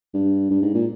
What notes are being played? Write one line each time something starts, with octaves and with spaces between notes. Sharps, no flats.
G2
G2
G#2
A#2